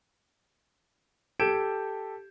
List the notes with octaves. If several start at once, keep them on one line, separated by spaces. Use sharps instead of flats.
G4 A4 G6 G#6 D7 E7